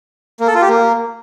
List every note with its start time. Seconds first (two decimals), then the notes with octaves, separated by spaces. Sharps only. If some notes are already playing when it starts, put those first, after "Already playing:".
0.40 A#3
0.47 A4
0.55 F4
0.62 G4
0.69 A#3